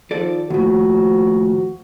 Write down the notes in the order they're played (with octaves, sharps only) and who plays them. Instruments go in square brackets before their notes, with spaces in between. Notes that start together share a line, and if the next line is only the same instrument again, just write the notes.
[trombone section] D#3 F3 [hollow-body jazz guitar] A4 D5
[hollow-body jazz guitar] D#2 A2 [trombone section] F3 F#4